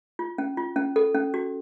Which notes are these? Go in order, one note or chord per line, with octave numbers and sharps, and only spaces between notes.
F4
C#4
F4
C#4
A4
C#4
F#4